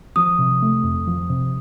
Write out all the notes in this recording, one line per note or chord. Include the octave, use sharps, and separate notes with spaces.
F3 D#6
C3
A3
F2
F3
C3